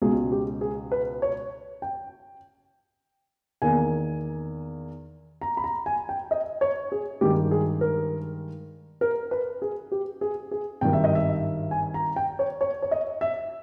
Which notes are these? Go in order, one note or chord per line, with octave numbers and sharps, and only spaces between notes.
C#2 B2 G#3 G#4
G4
G#4
B4
C#5
G5
E2 D#3 A#3 G#5
A#5
B5
A#5
G#5
G5
D#5
C#5
G#4
G2 D#3 G#3 G4
G#4
A#4
A#4
B4
G#4
G4
G#4
G#4
G#1 G2 D#3 G5
E5
D#5
E5
G#5
A#5
G5
C#5
C#5
C#5
D#5
E5